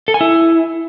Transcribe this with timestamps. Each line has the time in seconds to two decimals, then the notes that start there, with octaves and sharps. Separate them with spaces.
0.08 A4
0.14 G#5
0.21 E4